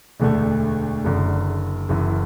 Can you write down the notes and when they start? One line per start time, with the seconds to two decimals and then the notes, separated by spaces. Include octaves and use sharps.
0.20 E1 D2 D3 A3
1.05 F#1 F#2 D3
1.89 F#1 F#2 E3